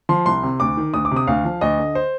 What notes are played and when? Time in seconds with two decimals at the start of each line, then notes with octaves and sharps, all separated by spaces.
0.09 F3 C6
0.26 C2 C6
0.43 C3
0.60 D2 D6
0.77 D#3
0.94 D2 D#6
1.05 D6
1.11 C3
1.16 D#6
1.27 D2 F5
1.45 F3
1.61 D2 D#5
1.79 D3
1.95 C5